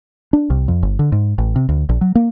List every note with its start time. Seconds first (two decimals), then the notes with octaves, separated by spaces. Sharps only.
0.33 D4
0.50 C2
0.68 F2
0.83 G1
0.99 D3
1.12 G#2
1.38 A1
1.56 C3
1.69 D2
1.89 A#1
2.01 F#3
2.15 A#3